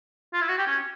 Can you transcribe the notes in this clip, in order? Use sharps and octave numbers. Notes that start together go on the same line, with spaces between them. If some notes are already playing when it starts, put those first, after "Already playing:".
F4
E4
F#4
G4
C#4